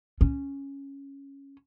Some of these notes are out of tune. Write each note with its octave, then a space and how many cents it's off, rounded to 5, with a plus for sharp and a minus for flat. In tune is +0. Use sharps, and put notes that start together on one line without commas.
C#4 -5